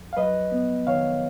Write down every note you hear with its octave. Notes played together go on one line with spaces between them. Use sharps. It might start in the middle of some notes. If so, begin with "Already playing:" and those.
Already playing: F2
F5
F#3 B4 D#5
B3
D#3 C#5 F5